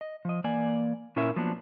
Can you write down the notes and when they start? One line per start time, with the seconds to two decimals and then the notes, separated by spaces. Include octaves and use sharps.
0.01 D#5
0.25 F3 D#5
0.44 E3 A#3 D5 G#5
1.16 A#2 C#4 E4 A#4 E5
1.36 F3 F#3 A#3 B3 D4